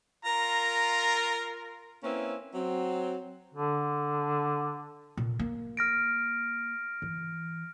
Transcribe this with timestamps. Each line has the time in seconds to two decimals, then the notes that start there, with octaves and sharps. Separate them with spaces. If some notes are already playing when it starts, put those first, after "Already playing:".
0.25 F4 A#4 A#5
2.04 A#3 C4 C#4 E4 B4
2.54 F#3 C4
3.54 D3
5.17 A#2
5.39 A#3
5.77 F6 A#6 D7
7.02 E3